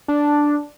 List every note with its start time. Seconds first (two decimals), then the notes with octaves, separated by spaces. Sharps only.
0.08 D4